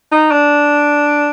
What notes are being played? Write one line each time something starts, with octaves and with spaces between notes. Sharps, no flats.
D#4
D4